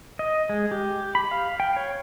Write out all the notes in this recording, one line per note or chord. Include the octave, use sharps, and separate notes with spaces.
D#5
G#3
G4
B5
F5
G5
C#5